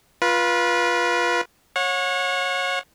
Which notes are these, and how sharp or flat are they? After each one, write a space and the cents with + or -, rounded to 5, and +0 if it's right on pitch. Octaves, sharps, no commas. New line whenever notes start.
F4 +0 B4 -25
C#5 -15 F#5 -35